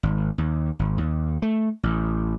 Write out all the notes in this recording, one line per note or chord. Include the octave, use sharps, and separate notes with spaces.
G#1
D#2
G#1
D#2
A3
A1